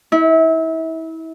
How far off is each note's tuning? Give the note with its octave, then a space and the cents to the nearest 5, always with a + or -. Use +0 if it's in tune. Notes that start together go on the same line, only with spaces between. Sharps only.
E4 -30